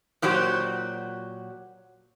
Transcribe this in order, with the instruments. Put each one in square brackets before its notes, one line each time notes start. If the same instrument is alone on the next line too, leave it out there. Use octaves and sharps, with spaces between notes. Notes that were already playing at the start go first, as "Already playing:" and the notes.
[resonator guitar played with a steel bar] A#2 F#3 F#4 G4 C5